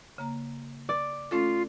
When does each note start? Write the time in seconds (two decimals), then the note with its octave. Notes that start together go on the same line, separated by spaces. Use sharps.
0.18 C#3 A#3 A#5
0.89 D5
1.31 A3 C#4 F4 A4